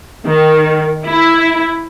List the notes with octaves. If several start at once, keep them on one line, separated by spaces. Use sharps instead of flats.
D#3
E4